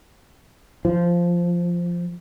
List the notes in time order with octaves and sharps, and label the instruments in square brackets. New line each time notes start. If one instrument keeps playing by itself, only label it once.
[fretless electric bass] F3